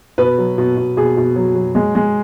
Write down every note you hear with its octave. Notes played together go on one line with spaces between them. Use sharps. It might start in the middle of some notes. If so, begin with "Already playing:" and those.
B2 B4
F#3
B2
B2
B2 G#4
B2
F#3
F#3
G#3
G#3